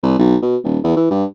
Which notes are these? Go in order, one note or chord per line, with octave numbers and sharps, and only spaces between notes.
C2
B1
B2
D#1
E2
E3
G2